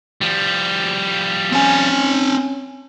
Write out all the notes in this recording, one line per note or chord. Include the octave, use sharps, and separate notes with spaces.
F3 G3
C4 C#4 G#5